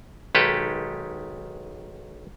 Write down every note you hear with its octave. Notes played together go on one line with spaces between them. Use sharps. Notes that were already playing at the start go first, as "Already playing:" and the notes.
B1 D#3 G#3 G4 A4 B4